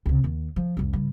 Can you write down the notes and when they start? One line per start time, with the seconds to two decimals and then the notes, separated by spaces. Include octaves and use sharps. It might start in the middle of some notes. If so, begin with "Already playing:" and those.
0.06 C#2 C3
0.24 D#2
0.56 F3
0.77 C2 F2
0.93 G2 C#3